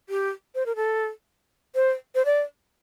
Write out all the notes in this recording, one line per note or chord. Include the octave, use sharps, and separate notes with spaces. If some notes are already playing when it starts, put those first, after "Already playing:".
G4
C5
A#4
A4
C5
C5
D5